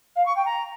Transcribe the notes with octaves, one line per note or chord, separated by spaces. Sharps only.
F5
C#6
G5
A#5